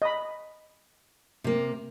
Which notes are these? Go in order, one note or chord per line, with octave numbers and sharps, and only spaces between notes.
D#5 B5
C3 A#3